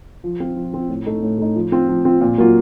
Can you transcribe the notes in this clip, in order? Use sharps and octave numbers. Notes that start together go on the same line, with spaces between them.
F3
C4 F4
F3
C4 F4
A2
A3 D#4
A2
A3 D#4
F3
C4 F4
F3
C4 F4
A#2
F#3 A#3 F4